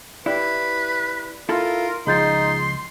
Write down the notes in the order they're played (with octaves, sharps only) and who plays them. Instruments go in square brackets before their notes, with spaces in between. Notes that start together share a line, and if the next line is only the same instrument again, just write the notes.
[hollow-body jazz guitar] E4 G4 [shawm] B4 [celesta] D5
[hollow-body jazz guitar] E4 A4 [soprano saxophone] F4 [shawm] A#4
[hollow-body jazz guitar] C#2 F3 [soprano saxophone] D#4 [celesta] G#4 G6 A6 [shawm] C6